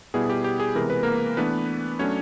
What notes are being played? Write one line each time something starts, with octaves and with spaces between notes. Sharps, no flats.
B2 G3 B3 E4 G#4
G4
G4
G#4
C3 E3 G#3 B3 A#4
B4
A#3 A#4
E3 A3 B3 D4 B4
F#3 A3 C#4 D4 C#5